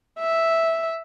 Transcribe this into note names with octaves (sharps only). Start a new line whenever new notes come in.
E5